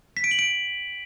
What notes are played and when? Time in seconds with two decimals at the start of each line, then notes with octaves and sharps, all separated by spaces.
0.17 B6
0.24 D7
0.31 F#7
0.39 D7